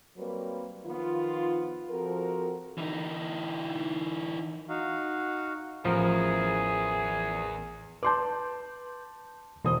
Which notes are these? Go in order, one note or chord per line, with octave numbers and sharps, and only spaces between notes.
F#3 G3 A#3 C4 A#4 B4
D#3 F3 B3 F4
F3 C4 F#4 A4 A#4
E3 D#4
D#4 F#4 F5
A1 E2 F3 G#4 A#4
B4 A5 C6 D6 G6
E1 E3 C5 D#6